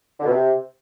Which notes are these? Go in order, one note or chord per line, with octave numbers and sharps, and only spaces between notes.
D3
B2
C3